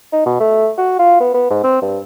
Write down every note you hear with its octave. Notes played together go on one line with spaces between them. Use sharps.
D#4
B2
A3
F#4
F4
B3
B3
G#2
C4
G2